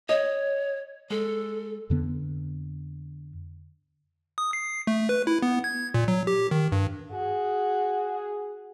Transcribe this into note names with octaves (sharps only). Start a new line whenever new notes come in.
C#5 D#5
G#3 A4
F2 D3 B3
D#6
C7
A3
B4
E4
B3
G#6
A#2
F#3
G4
D#3
G2
F#4 G#4